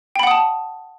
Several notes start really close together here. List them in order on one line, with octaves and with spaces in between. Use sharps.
G5 B5 F#5 D#6 A5